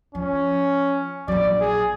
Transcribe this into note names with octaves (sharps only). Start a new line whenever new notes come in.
F3 C#4
A#1 F#3 D5
G#4